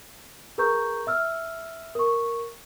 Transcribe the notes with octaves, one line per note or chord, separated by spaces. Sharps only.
G#4 A#4 B4 A#5 C#6 G6
E5 E6 F6
A#4 C#6